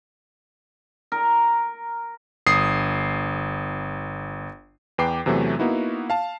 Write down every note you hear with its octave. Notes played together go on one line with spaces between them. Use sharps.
A#4
G1 D#6 C7
E2 B4 G5 D6 C7
E2 C3 E3 F#3 A3
A#3 B3 D#4 E4 F#4
F5 A5